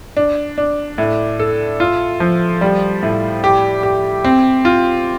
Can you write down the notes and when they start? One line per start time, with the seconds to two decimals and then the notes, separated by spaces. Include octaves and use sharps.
0.17 D4
0.58 D4
0.98 A2
1.39 A4
1.80 F4
2.20 F3
2.61 G3
3.03 A2
3.44 G4
3.83 G4
4.24 C4
4.65 F4